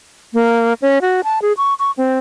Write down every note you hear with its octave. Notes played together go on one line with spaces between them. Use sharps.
A#3
C#4
F#4
A5
G#4
C#6
C#6
C4